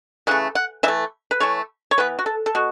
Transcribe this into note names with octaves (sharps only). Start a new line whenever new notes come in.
C#3 E3 A3 F#5
F#5
E3 A3 E5
B4
E3 A3 C#5
C#5
E3 B3 B4
F#4
A4
A4
B2 F#4